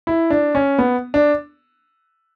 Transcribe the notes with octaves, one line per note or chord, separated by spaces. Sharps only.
E4
D4
C#4
B3
D4